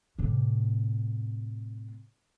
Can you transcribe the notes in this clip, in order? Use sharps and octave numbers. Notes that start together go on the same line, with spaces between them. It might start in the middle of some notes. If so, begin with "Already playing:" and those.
A2 C3